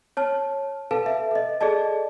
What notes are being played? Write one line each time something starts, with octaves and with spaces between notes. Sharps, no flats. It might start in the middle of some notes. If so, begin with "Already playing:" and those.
C#5 A5 F6
A4 B4 F5 A5
E5
A4 D#5
G#4 A4 D5 D#5 A5